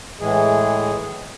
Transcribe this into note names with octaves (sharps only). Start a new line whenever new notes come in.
A2 E3 G#3 G#4